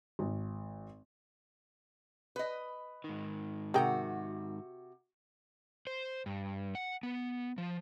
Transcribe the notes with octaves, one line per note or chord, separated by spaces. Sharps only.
G#1
B4 D#5
G#2 D#3
C3 F#4 G#4 A#4 G5
C5
G2
F#5
B3
F3